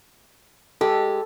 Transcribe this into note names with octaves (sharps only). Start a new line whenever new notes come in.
G#3 G4 A4